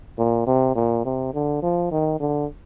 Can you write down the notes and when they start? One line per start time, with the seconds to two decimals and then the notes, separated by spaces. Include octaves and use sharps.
0.18 A#2
0.46 C3
0.75 A#2
1.05 C3
1.34 D3
1.62 F3
1.91 D#3
2.20 D3